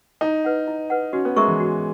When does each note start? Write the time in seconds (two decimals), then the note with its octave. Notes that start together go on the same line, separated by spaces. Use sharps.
0.21 D#4 E4
0.45 B4 F#5
0.67 E4
0.90 B4 F#5
1.13 C#4 F#4
1.25 B3
1.36 G#3 A#4 E5 A#5 C#6
1.48 E3
1.60 F#4